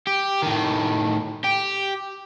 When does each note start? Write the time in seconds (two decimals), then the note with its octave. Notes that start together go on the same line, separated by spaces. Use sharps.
0.07 G4
0.42 A2 D#3
1.44 G4